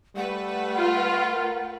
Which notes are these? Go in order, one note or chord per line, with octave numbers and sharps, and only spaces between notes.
G3 A3 B4 F#5
F4
A#4